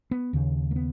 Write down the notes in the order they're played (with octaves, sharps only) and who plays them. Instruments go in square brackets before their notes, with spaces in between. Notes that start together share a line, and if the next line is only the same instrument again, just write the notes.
[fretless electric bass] B3
D#2 C#3
A#3
B3